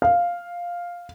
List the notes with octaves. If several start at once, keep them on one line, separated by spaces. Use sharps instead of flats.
F5